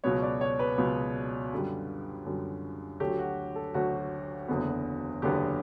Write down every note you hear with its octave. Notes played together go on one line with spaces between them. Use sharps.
C#2 B2 F#3 B3 C#5
D5
C#5
B4
C#2 B2 F#3 B3
F#2 D3 G3
F#2 D3 G3
D2 D3 F#3 A3 G4
F#4
A4
D2 D3 F#3 A3 F#4
F#1 E2 D3 F#3 B3
F#1 E2 D3 F#3 B3 G4